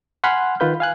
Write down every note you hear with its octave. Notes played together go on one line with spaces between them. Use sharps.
F#5 G#5 B5 C6 F6 F#6
D#3 F4 B4 G6
F5 G#5 F#6